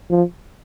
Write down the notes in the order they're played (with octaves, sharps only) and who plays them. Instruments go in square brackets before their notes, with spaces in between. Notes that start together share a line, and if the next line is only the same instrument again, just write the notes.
[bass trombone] F3